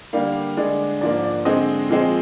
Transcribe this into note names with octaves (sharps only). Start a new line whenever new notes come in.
D3 G3 A#3 D4 F5
D3 G#3 D4 D5
G#2 F3 A#3 D4 D5
D5
D3 G#3 C4 D#5
A#2 F3 G#3 C4